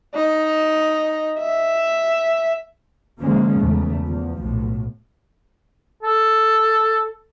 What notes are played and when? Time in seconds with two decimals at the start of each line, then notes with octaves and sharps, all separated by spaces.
0.15 D#4
1.40 E5
3.19 D3 E3 F3 G#3 A#3 C#4
3.58 E2 C#3 A3
4.03 E2 F3
4.38 B1 A2
6.03 A4